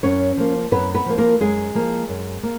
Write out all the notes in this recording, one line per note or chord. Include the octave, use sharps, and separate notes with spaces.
F#2 C#4 C#5
F3 A#3
F#2 B3 B4
B3 B4
F3 A#3
A#3 A#4
F#2 G#3 G#4
F3 A#3
F#2
A#3